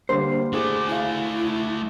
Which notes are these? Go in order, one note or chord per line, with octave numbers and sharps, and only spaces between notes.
D3 G3 A#3 C5
A3 E4 F#4 G#4 D6
E4 F5 G#5